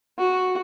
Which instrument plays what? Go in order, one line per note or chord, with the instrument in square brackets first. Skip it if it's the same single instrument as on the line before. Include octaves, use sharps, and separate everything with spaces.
[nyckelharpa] F#4